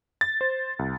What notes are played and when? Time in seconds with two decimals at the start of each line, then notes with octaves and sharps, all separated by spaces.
0.21 A6
0.41 C5
0.79 C2